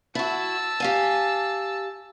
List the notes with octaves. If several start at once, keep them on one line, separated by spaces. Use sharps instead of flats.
E4 F#4 A5 E6
G4 F5 G#5